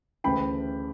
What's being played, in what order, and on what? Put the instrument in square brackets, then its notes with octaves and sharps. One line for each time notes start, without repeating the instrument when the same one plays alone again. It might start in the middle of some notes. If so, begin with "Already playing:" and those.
[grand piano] D2 C#3 E3 A3 G5 B5